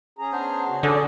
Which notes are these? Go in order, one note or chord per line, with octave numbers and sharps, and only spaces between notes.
C#4 G#4 A#5
B3 D4 C5
C#3 F#4
D3 C#4 F#4 G#4 D5 F#5